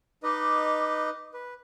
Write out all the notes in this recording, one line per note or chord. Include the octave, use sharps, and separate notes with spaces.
D#4 B4 D#5 D6
B4